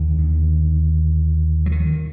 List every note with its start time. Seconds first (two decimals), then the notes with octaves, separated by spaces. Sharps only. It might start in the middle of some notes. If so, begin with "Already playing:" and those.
Already playing: D#2 D3
0.19 D#3
1.66 F#3
1.72 D#3